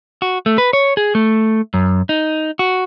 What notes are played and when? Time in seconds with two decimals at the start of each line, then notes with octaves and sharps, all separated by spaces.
0.22 F#4
0.46 A3
0.58 B4
0.73 C#5
0.97 G#4
1.15 A3
1.74 F#2
2.09 D#4
2.59 F#4